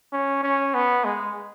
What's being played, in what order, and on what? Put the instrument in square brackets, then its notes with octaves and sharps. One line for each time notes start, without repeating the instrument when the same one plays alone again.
[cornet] C#4
C#4
B3
G#3